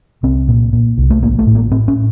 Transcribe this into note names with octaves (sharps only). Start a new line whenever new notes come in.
C2 C4
A#2
A#2
C2
A3
A1 A#3
A3
A2
A#3
A2 C4
C#4